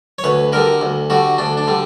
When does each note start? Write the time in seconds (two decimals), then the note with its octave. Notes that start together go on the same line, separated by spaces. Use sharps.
0.18 C#5
0.24 D2 B4
0.53 D3 G3 A#4
0.81 D2
1.10 D3 G3 F#4
1.38 D2 D4
1.57 D4
1.67 D3 G3